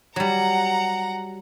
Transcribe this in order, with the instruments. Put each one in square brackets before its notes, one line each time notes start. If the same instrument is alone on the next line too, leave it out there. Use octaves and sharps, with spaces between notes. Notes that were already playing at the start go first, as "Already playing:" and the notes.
[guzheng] F#3 G3 [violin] F#5 A#5